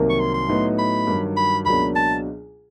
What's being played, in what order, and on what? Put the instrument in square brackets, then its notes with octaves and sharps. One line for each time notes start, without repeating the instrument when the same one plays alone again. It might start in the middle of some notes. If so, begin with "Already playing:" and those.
Already playing: [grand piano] C2 C3 D#3 F#3 A#3
[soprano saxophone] C#6
C6
C6
[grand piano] A2 F#3 B3 D#4
[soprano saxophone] B5
[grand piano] G2 D#3 F#3
[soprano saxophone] B5
[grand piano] C#2 B2 F#3 A#3 D4 [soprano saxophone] B5
[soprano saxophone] A5